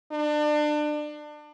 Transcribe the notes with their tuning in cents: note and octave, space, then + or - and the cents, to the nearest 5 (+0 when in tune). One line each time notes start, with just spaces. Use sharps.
D4 +30